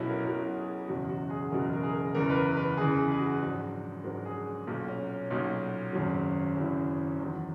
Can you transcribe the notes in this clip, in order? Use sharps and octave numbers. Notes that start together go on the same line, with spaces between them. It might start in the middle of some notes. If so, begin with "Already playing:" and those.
Already playing: B1 B2 F#3 B3 C#4 E4
A#4
B1 B2 F#3 A#4
G#4
F#1 E2 B2 F#3 F#4
F#4
G#4
F#1 E2 B2 F#3 A#4
A#4
G#4
A#4
F#1 E2 C#3 E3 A#4
B4
A#4
B4
F#1 E2 C#3 E3 G#4
G#4
G#4
F#4
A#1 G#2 F#3
A#1 G#2 F#3 A#4
G#4
B1 A#2 F#3
C#4
C#4
B1 A#2 F#3 D#4
G#1 F#2 C#3 F#3
G#1 F#2 C#3 F#3 E4
E2 D#3 F#3